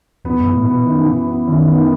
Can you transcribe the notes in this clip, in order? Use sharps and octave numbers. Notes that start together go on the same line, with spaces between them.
E2 B3
F#2
E3
A2
B3
B2
F#2 D#3
E3
B3
F#2 D#3
B3